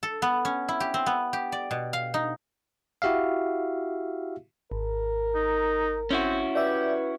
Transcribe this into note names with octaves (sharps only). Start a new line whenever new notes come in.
A4
B3
C#4
E4
G4
C4
B3
G4
D5
B2
F5
D#4
E4 F#4 G4 E5 F5
G#1 A#4
D#4
C4 C#4 E4 F#4
G4 B4 D5 E5